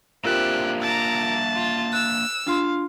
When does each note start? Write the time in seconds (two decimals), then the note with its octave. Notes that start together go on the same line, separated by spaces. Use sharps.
0.24 A#3 C4 D4 F4 G4 A#4 E5 F#6
0.82 A5 A#5 D6
1.55 F4
1.93 E6 F#6
2.46 D4 F4 F5 C6